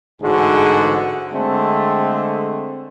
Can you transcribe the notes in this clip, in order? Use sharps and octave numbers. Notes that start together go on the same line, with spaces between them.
A1 G#2 D3 F#4 G#4
D3 G#3 A3 C4